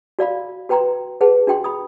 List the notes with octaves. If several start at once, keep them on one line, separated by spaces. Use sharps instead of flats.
F#4 D5 F5 B5
F#4 B4 G5 A#5 C6
G#4 B4 F#5 A5
D4 F#4 G5 C6
B5 D#6